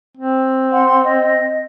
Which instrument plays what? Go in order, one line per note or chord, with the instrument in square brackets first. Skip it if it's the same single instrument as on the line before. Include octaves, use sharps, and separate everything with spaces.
[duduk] C4
[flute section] F#5 C6
D#5